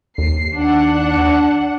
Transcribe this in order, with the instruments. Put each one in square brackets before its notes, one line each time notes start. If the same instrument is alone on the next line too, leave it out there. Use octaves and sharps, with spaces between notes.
[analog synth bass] D#2 [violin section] C7
[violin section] D4 F#5